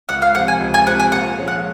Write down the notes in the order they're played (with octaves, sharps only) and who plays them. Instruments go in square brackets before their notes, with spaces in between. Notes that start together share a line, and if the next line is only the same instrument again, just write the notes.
[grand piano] C#2 [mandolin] F#5
[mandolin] F5
[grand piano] C3 F3 C4 [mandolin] F#5
[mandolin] G#5
[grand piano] C#2
[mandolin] G#5
[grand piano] C3 F3 C4 [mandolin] F#5
[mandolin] G#5
[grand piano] A#2 [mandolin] F#5
[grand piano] F3 G#3 C#4 G#4
[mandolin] F#5